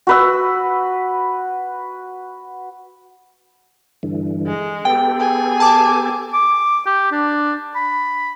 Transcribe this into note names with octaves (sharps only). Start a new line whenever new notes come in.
F#4 B4 E6
G2 D3 E3
G#3
B3 G4 A4 G5
G#4 G#5
A5 D6
D6
G4
D4
B5